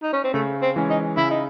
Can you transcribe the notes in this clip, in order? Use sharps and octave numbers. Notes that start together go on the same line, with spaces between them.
D#4
C#4
C4
C#3 A3
C4
E3 G#3 C#4
D#4
C#3 E4
D#4